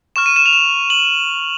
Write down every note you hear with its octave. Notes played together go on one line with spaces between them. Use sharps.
C#6 F6 E7
D#7
E7
F7
E7
F#7